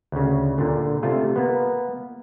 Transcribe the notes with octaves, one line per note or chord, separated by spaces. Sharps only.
D2 C#3
A#2 D3
C3 A3 F4 A4
A#3 B3